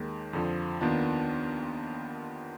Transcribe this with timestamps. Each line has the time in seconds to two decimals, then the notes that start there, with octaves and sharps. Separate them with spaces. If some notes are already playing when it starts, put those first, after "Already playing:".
Already playing: D#2 D#3 G#3
0.33 F2 D3 F3
0.81 D#2 D#3 B3 D4 F4